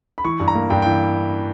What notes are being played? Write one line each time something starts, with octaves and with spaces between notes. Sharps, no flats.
B5
E3 C#6
G2
A#5
A#3
G2 G5
E3 G5